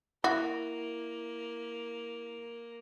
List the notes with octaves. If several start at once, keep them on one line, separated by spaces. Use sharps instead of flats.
A#3 E4 F#4